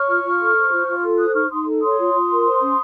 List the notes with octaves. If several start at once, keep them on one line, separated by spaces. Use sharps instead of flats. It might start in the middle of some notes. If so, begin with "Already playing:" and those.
Already playing: C#5 C#6 F6
F4
F4
A4
C5
F4
F4
A4
C5 D#6 F#6
D#4 C#6 F6
D#4 C6 D#6
A4
C#5 C6 D#6
F4
F4
A#4
C5
C#4